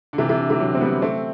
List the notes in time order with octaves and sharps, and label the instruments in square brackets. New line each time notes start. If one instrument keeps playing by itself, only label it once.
[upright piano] D3
C3 E3
C3 E3
D3
C3 E3
D3 F#3
C4
G3 B3
A3 C4